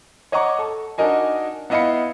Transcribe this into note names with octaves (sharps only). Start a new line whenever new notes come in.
C#5 D#5 F#5 A#5 C#6 D6
A4
D4 D#4 F#4 A#4 D#5 G#5
B3 E4 D#5 F5 B5 C#7